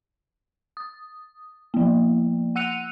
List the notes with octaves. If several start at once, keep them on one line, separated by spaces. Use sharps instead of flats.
D#6
F3 A#3
F#5 E6 F#6 C#7 D#7 F7